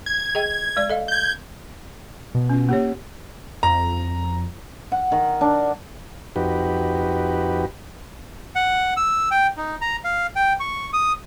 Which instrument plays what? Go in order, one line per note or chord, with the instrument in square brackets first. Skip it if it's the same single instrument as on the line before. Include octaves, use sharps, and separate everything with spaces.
[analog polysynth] G#6
[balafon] G#4 D#5 G5
G#3 D5
A4 D#5 F5
[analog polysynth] G6 G#6
[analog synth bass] B2
[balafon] C#4 F4
A#3 G4 C#5
[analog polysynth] F2 [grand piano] A#5
[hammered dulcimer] F#5
D#3
D4
[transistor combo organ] F2 D#4 F#4 G4 B4
[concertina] F#5
E6
G5
D#4
A#5
F5
G5
C#6
D#6